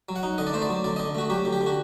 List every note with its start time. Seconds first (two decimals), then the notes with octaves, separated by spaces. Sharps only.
0.09 F#3
0.16 F#5
0.23 D#4
0.38 D3 D#5
0.47 D5
0.53 A3 C5
0.62 D5
0.69 F#3
0.84 D3 D5
0.96 D3 D#5
1.15 A3 F#4
1.30 F#3 G4
1.45 D3
1.53 G4
1.61 D3
1.66 F#4